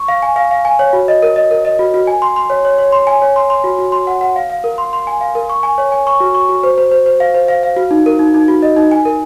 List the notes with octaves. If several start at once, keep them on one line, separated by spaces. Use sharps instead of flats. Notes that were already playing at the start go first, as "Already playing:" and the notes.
Already playing: C#6
F5
G#5
F5
F5
G#5
C#5
F#4
D#5
A#4
D#5
A#4
D#5
F#4
F#4
G#5
C6
C6
C#5
C#5
C#5
C6
G#5
C#5
C6
C6
F#4
F#4
C6
F#5
F#5
F5
F5
A#4
C6
C6
G#5
F5
A#4
C#6
G#5
C#5
G#5
C#6
F#4
C#6
F#4
C5
C5
C5
C5
F5
C5
F5
F5
F#4
D#4
A#4
D#4
D#4
F#4
D#5
D#4
G#5
A#4